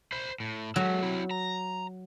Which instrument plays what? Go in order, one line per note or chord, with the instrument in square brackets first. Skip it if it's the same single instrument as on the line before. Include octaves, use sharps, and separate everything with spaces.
[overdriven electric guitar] C5 B5
A2
[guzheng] F#3 [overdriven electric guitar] G#3 A4
[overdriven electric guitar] C4 E4
A#5